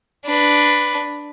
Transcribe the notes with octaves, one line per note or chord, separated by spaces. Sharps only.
D4 B4